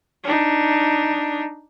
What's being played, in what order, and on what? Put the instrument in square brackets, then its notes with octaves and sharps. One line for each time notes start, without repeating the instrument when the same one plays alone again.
[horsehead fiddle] D4 D#4